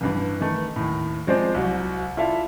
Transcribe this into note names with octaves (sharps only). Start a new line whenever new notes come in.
A1 G2 E3
D#3 E3 A3
D#2 A2
F3 G#3 C4 C5 D5
C2 F#3
E4 F4 A4 D5 E5 F5